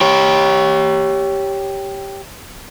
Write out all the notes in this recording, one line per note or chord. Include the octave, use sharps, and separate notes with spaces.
G4 C#5